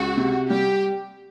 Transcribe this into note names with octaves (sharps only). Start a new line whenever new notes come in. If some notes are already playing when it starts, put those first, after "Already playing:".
Already playing: C#2 F#4
C3
G3 G4